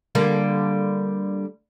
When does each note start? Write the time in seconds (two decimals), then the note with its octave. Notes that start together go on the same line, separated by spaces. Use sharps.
0.15 D3 G3 A#3